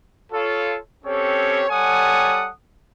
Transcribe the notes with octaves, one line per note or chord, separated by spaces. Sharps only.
F4 A4 C#5
C4 C#4 G4 A4 C#5
G3 A4 C#5 F#5 G#5 D#6